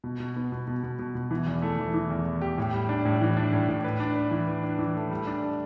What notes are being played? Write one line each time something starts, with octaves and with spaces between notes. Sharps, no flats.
B2
B2
B3
B2
B2
B2
B2
B2
E3
E2
A3
E3
E3
E2
E2
G4
A2
G3
D4
A2
E3
D4
A2
A2
B4
D4
B4
E3
B4
D4
E3
A3
G3
D4
A4